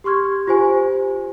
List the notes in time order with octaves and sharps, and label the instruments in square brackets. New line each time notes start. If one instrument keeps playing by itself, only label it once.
[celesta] G4 C6 C#6 F6 G#6
F4 G4 C5 G#5